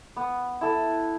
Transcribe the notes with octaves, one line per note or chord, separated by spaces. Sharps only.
B3
E4 A4